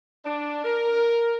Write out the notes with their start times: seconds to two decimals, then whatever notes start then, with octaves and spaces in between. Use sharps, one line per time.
0.25 D4
0.64 A#4